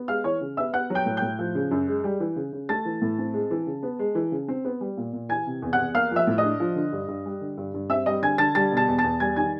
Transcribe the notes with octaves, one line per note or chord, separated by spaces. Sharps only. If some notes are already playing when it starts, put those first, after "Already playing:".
Already playing: B3
G#3 F5 F6
E3 C#5 C#6
C#3
B3 E5 E6
B3 F#5 F#6
F#3
G5 G6
A2
A2 G5 G6
F3
C#3
F#2
G#3
G3
E3
C#3
C#3
A3 A5 A6
E3
A2
C4
G#3
E3
C#3
B3
G#3
E3
C#3
C4
B3
G3
A#2
A#2
E3 G#5 G#6
C3
E2
F#5 F#6
E2
A#3 F5 F6
F3 E5 E6
A2
D#5 D#6
D4
F3
D3
G2
G2
G3
D3
G2
G2
C4 E5 E6
G3 D#5 D#6
D3 G#5 G#6
D3 A5 A6
G3 A5 A6
B2
A5 A6
E2
A5 A6
E2
G3 G#5 G#6
D#3 G#5 G#6